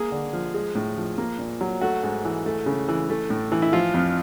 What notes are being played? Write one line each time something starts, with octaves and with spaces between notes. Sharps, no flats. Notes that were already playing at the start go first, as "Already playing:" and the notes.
Already playing: A#3 G#4
D3
F3
G#3
A2
F3
A#3
A#2
F#3
A3 F#4
G#2
E3
A3
C#3
E3
A3
A2
E3
E4
F3 F4
F2